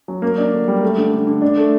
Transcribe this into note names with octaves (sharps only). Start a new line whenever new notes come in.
F#3
A#3
D4
D3
G3
A3
D3
D3
D3
D4
A3